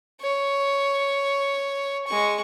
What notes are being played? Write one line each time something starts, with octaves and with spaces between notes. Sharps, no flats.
C#5
G#3 C#6